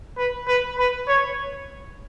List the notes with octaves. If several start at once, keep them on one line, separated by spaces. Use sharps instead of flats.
B4
B4
B4
C#5